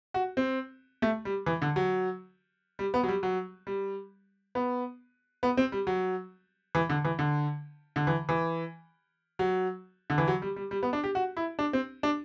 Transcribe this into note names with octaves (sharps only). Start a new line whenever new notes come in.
F#4
C4
A3
G3
E3
D3
F#3
G3
B3
F#3
G3
F#3
G3
B3
B3
C4
G3
F#3
E3
D3
E3
D3
D3
E3
E3
F#3
D3
E3
F#3
G3
G3
G3
B3
D4
G4
F#4
E4
D4
C4
D4